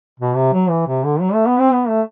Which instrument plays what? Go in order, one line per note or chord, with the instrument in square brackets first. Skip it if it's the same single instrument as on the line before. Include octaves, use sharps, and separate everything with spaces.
[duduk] B2
C3
F#3
E3
C3
D3
F#3
A3
B3
C4
B3
A3